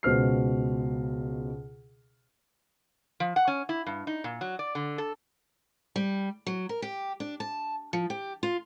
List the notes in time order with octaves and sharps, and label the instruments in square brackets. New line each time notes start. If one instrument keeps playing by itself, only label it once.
[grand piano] C#2 B2 C5 F6 C7
[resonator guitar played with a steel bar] F3
F#5
C#4
E4
G2
D#4
A#2
F#3
D5
D3
A4
[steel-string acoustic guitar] G3
F#3
A#4
G4
D4
A5
F3
G4
F4